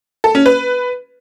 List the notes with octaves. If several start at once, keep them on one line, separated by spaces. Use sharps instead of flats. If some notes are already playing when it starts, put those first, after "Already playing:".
A4
C#4
B4